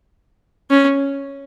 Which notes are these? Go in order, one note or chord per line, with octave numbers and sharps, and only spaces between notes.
C#4